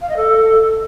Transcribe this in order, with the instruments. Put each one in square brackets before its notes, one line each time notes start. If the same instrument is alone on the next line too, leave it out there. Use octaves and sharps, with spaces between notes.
[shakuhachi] F5
D#5
A4